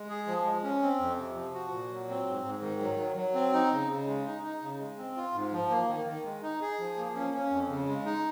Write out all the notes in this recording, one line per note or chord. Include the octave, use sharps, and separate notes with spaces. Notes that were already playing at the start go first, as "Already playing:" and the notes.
Already playing: G#3
G#4
F3
G#3
C#4
C4
F2
C3
F3
F#4
A#2
F#3
C4
G#2
G#2
D#3
F#3
F#3
F#3
C4
D#4
C#3
C#3
G#3
D#4
D#4
C#3
G#3
C4
F4
G#2
F3
A#3
D#3
D#3
G#3
D#4
G#4
F3
A#3
C#4
C#4
F2
C#3
G#3
D#4